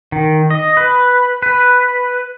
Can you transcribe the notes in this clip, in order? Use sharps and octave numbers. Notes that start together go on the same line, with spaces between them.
D#3
D#5
B4
B4